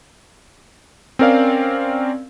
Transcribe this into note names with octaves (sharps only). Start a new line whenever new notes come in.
C4 C#4 A#4 D5 F5